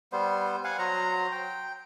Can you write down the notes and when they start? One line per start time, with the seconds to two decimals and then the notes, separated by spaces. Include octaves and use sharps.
0.12 G3 B3 C5
0.64 F5 F#5 G#5
0.79 F#3 C5 A#5
1.32 G5